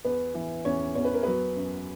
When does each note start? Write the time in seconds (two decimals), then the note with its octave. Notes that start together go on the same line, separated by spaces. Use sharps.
0.04 E2 B3 B4
0.34 E3
0.65 E2 C#4 C#5
0.95 E2 C#5
1.05 B4
1.14 A#4
1.23 F#3 B3 B4
1.56 F#2